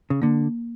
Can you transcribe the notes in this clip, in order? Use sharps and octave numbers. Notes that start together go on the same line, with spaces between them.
C#3
D3 A#3